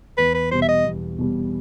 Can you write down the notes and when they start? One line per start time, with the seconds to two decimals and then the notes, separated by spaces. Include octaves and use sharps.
0.18 E2 B4
0.34 B4
0.51 B2 G3 C5
0.62 E5
0.68 D#5
0.85 E2
1.19 B2 G3